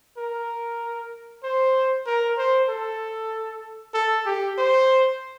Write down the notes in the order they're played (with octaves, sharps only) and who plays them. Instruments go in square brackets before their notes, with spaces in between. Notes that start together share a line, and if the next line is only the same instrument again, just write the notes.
[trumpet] A#4
C5
A#4
C5
A4
A4
G4
C5